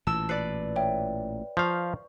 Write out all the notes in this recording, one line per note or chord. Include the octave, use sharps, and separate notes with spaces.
A1 A#2 E3 A5 E6
B4 D5 C7 C#7
C#5 E5 G5
F3 F5 C#6 G6